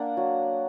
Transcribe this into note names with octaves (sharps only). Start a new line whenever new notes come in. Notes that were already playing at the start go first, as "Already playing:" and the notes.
Already playing: A#3 D4 F#5
F#3